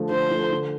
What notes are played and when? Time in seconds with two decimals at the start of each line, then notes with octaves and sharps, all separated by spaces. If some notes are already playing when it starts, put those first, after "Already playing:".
Already playing: D3 F3 A3
0.10 D3 C5
0.31 F3 A3
0.51 D3